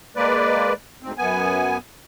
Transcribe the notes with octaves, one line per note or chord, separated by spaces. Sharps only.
G#3 A#3 B4 D5
D2 G#2 C4
F#2 B3 G#5